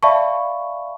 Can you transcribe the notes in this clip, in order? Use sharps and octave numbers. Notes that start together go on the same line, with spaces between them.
D5 E5 F5 A5 B5 C#6